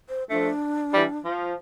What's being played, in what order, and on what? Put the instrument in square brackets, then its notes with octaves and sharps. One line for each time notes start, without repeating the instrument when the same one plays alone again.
[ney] C5
[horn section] F3 A3 [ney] D4
[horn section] E3 G3
F3